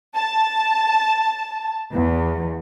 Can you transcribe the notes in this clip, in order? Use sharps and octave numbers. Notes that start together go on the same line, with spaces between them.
A5
E2